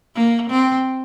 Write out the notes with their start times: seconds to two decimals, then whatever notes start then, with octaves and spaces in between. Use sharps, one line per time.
0.15 A#3
0.50 C4